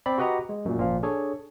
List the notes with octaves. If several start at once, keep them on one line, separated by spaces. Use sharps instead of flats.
C4 D5 B5
F#4 G4 B4 D#5 F#5 A#5
G#3
F#2 A#2
G#1 A#2 F3 F5
D4 G#4 A4 C#5